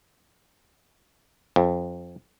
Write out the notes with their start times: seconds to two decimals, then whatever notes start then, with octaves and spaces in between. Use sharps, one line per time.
1.56 F2